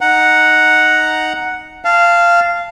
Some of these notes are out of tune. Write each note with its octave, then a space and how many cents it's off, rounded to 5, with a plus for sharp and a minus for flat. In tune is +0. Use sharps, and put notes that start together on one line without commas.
D#4 +0 F#5 +0 A#5 +0
F5 -15 A5 +0